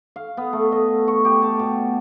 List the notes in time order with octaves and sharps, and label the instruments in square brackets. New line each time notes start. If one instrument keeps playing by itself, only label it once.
[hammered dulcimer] F5
B3
A3
D#5
C#6
G4
A5
B2